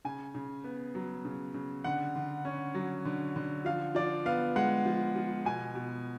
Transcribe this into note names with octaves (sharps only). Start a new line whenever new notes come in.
C#3 G#5
C#3
B3
F#3
C#3
C#3
D3 F#5
D3
C#4
F#3
D3
D3
F3 F5
F3 D5
B3 F5
G#3 F#5
F3
F3
B2 G#5
B2